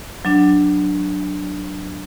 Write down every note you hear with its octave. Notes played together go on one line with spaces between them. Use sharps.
F#3 D4